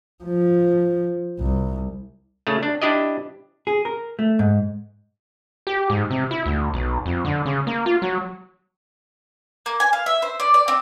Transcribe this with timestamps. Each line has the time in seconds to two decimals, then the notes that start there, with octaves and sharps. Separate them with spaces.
0.24 F3
1.40 C2
2.47 C#3 A3
2.63 D4
2.82 D4 E4 G4 D5 D#5
3.67 G#4
3.85 A#4
4.19 A3
4.39 G#2
5.67 G4
5.90 G#2
6.11 C3
6.31 E4
6.46 D2
6.74 B1
7.06 F2
7.25 D3
7.46 C#3
7.67 A#3
7.86 F4
8.02 F#3
9.66 A#3
9.80 G#5
9.93 F5
10.06 E5
10.22 C5
10.40 D5
10.54 D5
10.68 C4